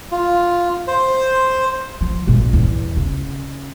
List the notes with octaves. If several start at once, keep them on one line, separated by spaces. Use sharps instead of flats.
F4
C5
F3
A#1 G2
E2
C#3